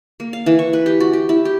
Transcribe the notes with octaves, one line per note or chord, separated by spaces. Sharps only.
A#3
F5
E3
C#6
B4
G4
F#4
G4
E4
G4